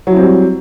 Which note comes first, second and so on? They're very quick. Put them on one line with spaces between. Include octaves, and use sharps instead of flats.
F#3 E4 C4 G3